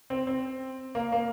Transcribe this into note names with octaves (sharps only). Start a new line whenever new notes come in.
C4
C4
A#3
A#3